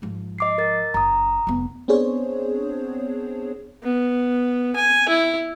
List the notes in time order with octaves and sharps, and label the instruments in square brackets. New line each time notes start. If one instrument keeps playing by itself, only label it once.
[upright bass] G#2 F3
[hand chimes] D#5 D6 C7
A#4 A6
[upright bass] F#1 [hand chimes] A#5 D#6
[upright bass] F1 B3
[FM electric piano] B3 C4 D4 G#4 C5 C#5
[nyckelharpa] B3
G#5
E4